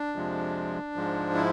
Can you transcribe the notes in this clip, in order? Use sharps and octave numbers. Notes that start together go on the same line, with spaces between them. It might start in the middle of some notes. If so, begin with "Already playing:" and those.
Already playing: D4
F2 C3 F3 G#3
G#2 F3 G#3
E4